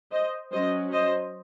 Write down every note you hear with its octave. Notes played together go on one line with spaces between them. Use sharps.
C5 D#5
F#3 C#4 C5 D#5
C5 D#5